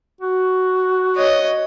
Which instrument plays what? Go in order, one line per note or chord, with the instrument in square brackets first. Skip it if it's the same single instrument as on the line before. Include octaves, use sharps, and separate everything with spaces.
[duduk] F#4
[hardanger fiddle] C#5 D#5